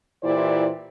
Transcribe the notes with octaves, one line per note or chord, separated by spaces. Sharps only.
A#2 E3 E4 G4 C5 D5